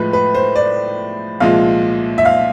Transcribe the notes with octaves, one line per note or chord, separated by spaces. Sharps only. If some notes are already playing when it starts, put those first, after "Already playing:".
Already playing: A2 F3 G#3 B4
B4
C5
D5
C2 A#2 F3 G#3 F5
E5
F5